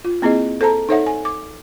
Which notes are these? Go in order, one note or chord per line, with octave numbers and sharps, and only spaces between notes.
F4
A#3 C4 E4 G#4 D#5
A4 C5 A5 A#5
D#4 A4 C5 C#5 E5 F#5
G#5
D6